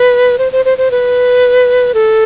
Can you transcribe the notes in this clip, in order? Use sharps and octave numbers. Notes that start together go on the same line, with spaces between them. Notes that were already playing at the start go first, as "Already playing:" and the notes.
Already playing: B4
C5
C5
C5
C5
B4
A4